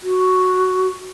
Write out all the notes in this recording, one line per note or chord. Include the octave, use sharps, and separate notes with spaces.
F#4